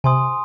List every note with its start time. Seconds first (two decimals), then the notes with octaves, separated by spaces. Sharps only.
0.04 C3 G#5 C6 D#6